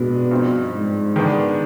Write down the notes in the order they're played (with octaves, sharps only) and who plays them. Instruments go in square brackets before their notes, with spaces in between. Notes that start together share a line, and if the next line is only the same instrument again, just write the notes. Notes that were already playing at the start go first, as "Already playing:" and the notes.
Already playing: [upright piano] G2 G#3 B3 D4 [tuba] B2
[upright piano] G2 F3 C4 D#4
[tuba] G#2
[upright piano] D#3 G#3 B3 D4